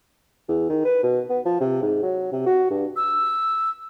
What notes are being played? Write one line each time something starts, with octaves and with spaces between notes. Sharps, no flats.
E2
D#3
B4
B2
B3
F3
C3
G#2
F#3
C3
F#4
G2
E6